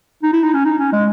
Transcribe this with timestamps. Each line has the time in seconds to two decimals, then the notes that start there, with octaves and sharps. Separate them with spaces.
0.23 D#4
0.33 E4
0.44 D#4
0.54 C#4
0.65 D#4
0.79 C#4
0.92 G#3